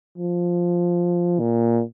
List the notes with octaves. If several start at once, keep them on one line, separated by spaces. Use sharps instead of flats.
F3
A#2